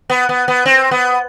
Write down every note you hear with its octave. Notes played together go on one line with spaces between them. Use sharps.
B3
B3
B3
C4
B3